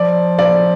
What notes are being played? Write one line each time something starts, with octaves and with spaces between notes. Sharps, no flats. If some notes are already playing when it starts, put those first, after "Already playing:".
Already playing: F3 D5
D5